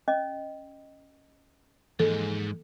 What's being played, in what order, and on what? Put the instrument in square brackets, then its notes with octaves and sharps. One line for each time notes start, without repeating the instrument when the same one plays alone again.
[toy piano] C#4 D#5
[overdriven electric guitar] G#2 G#3 [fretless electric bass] E3 F3 A#3 [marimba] A4